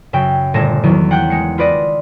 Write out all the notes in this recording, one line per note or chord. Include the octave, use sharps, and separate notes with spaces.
F#2 C#3 E5 G5
G1 A#2 A3 A5 A#6 E7
E2 D#3 F#3
F#5 G5 F#6 G6
G#3 C#7
F4 B4 D5 D#5